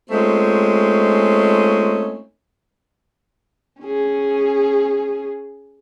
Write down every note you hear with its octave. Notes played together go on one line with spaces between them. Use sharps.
G#3 A3 C4 C#4 D#4 F4
C#4 G#4